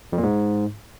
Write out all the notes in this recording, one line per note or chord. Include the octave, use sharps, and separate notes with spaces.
F2
A#2
G#2